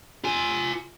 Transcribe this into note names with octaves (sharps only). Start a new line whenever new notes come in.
F4 G#5